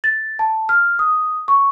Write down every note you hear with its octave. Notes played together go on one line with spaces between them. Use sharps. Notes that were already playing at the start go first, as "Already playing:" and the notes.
A6
A5
F6
D#6
C#6